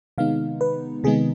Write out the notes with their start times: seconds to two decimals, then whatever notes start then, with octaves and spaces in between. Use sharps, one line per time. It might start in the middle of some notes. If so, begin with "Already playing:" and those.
0.18 C3 D#3 G#3 B3 D#4 F5
0.61 B4
1.04 C3 D#3 G#3 B3 D#4 G#4